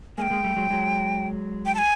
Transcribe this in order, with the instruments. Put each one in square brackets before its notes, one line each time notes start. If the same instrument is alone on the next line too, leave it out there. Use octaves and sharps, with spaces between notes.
[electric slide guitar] G#3 A#3 [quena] G5 G#5
[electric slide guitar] G#3 A#3
G3 A3
F#3 G#3
F#3 G#3
[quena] G5
A5
G#5